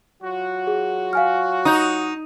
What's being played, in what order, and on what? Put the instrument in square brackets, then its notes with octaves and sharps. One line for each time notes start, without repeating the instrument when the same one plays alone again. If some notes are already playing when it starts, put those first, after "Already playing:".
[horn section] F#3 F4 F#4
[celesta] G#4
F5 G#5 F6
[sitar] D#4 [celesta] D#6 G6